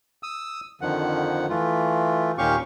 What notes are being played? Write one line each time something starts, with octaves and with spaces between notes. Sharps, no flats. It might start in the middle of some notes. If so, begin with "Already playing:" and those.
D#6 E6
F2 D3 D#3 F3 F#5
E3 A3 F4
D#2 A#2 C#4 G4 F5 C#6